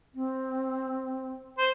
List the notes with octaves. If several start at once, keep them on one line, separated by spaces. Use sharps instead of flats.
C4
C5